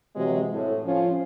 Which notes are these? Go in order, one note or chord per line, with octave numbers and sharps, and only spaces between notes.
C3 E3 F#3 G#3
A2
F3 C#4 F4